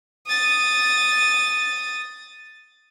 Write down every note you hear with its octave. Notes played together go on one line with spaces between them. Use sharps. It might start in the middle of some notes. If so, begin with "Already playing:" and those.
D#6 A6